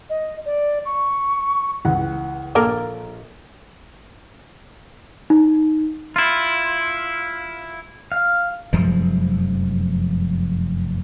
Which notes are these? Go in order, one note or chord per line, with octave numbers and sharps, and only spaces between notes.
D#5
D5
C#6
C#2 E3 F#5
A#1 A#3 A4 A#4
D#4
E4 F4
F5
F1 F#2 F3 G#3